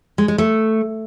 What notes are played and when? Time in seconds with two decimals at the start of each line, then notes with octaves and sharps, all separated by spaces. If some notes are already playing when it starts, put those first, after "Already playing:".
0.18 G#3
0.28 G#3
0.38 A3